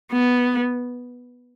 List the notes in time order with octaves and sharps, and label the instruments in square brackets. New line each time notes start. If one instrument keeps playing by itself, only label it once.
[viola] B3